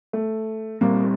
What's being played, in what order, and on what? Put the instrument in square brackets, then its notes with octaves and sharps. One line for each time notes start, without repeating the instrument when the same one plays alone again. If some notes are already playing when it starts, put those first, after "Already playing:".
[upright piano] A3
[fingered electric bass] A#2 G3 C4 [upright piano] A#3